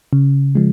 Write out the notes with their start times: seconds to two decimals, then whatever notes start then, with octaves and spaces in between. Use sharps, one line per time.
0.13 C#3
0.55 F3 G#3